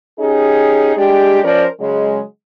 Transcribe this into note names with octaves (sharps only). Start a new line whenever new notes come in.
C#4 D#4 G4 G#4
G#3 D4 G4
F3 C#4 A#4 C5 D5
C#3 F#3 G#3